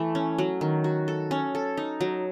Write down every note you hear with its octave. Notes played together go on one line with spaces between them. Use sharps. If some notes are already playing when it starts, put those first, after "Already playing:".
Already playing: E3 A3
C#4
F#3
D#3
F#4
A4
C#4
A4
D#4
F#3